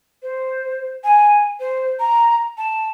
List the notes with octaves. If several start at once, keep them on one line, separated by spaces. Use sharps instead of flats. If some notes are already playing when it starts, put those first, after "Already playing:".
C5
G#5
C5
A#5
A5